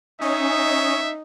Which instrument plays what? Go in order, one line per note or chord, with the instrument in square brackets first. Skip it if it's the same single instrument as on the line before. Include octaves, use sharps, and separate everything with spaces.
[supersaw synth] C#4 [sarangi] D#4 [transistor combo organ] C#5 D#5 [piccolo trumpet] E5